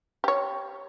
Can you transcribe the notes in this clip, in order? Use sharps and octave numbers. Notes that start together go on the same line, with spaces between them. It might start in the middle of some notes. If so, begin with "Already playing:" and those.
G4 C#5